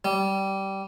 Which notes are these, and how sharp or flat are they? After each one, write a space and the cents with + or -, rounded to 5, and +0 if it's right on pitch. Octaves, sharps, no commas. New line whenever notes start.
G3 -15